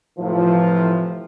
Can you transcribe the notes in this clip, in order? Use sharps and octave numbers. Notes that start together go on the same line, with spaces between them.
A2 C3 E3 F3